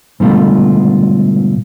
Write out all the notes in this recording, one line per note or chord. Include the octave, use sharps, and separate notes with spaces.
G#2 B2 D3 G3 A3 F4